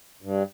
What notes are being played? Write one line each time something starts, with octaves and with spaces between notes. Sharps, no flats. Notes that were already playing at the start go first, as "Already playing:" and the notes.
G2